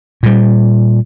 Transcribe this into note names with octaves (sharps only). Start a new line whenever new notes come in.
A#2 G3